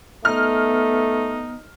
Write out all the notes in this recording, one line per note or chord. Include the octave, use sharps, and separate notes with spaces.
A3 B3 D#4 F6